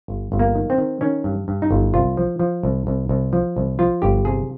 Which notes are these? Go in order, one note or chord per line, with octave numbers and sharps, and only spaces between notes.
G1
G1
A#3
D#3
C4
D#3
D#3 C#4
G2
G2
D#4
G1
C2 F4
F3
F3
C2
C2
C2
F3
C2
F3 F4
G1 G4
C3 G#4